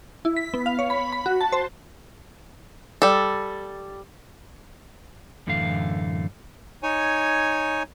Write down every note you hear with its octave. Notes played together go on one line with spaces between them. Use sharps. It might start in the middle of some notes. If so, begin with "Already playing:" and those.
E4
B6
B3
F5
C#5
B5
B5
F#4
A5
C5
G3 A4
F#2 A2 D3 E3 A3 F5
D#4 C#5 G#5